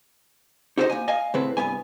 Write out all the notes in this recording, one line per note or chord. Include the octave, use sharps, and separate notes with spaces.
D#4 F#4 A4 B4 C5 D#5
A#3 G#5
D#5 F5 G#5
A2 C#3 C4 B4
C2 G2 B3 G#5